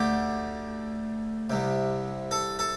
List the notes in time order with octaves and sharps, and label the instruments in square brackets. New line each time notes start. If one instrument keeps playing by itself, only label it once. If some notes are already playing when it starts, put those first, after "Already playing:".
Already playing: [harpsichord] D2 D3 G4
C2 C3
A4
A4